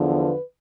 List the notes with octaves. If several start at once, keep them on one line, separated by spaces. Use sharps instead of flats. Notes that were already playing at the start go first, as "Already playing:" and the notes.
Already playing: E2 D3 F3
B4